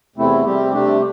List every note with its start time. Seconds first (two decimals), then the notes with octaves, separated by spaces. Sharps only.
0.16 E2 C3 A3 C4 E4
0.45 C3 G3 C4 G4
0.73 C3 A3 D4 G4